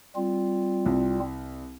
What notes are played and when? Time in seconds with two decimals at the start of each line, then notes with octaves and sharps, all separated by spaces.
0.16 G3 C4 F4
0.86 C2